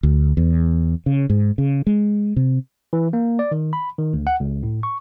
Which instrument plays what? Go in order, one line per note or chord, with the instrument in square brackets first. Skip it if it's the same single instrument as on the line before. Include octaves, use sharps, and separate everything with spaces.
[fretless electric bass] D2
E2
C#3
G#2
C#3
G#3
C3
[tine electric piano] E3
A#3
D5
D#3
B5
D#3
D2
F#5
C#2
A2
C#6